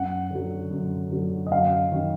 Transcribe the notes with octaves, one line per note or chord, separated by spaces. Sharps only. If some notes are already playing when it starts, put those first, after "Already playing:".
Already playing: F#2 F#5
D3 F#3
F#2
D3 F#3
D#5
F#2 F5
D#3 F#3